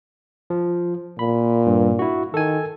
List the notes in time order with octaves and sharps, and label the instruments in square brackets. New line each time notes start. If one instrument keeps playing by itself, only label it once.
[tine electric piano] F3
[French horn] A#2 [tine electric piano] B5
[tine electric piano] G2
E4 F#4
[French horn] D#3 [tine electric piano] A4 G#5